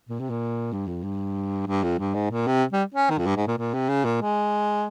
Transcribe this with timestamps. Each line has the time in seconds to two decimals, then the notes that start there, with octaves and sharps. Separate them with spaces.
0.09 A#2
0.20 C3
0.30 A#2
0.73 G2
0.87 F2
1.04 G2
1.67 G2
1.84 F2
1.99 G2
2.15 G#2
2.31 A#2
2.47 C3
2.73 G3
2.94 C#4
3.10 D#3
3.18 F2
3.26 G2
3.36 G#2
3.47 A#2
3.58 A#2
3.74 C3
3.89 C#3
4.05 A#2
4.21 G#3